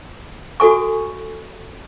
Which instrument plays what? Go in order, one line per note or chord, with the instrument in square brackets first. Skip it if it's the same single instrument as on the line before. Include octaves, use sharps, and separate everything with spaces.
[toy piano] F#4 A4 G#5 C#6